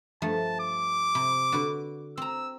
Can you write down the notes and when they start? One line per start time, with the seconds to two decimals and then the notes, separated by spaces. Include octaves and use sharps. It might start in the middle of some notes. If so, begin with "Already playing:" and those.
0.22 G2 F3 A3 A5
0.60 D6
1.15 C3 B5
1.52 D3 F#4 B4
2.18 C4 A#5 E6